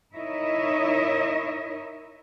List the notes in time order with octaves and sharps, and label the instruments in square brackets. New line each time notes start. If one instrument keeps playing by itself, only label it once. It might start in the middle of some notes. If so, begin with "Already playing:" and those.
[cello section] D#4 E4 A#4 C#5 D#5 E5